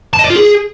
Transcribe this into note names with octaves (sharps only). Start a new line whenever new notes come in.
A5
D#5
D5
F4
G#4